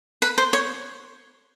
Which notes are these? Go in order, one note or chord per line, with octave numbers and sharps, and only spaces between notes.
B4
C5
C#5